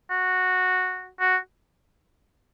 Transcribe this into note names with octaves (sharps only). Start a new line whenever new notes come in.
F#4
F#4